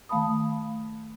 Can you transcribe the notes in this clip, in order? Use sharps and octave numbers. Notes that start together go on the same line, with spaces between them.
D#3 A3 F5 A5 B5 D#6